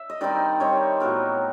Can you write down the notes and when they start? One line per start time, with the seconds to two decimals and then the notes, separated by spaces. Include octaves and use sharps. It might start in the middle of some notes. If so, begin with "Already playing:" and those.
Already playing: E5
0.10 D#5
0.21 D#3 G3 C4 D#4 D5
0.60 D#3 G3 C4 D#4 C#5
1.00 A2 F#3 B3 A#4